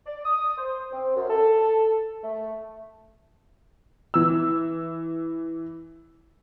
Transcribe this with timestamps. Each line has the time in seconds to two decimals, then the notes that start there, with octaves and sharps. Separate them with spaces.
0.07 D5
0.25 D#6
0.58 C5
0.92 C4
1.16 F#2
1.30 A4
2.24 A3
4.14 E3 E6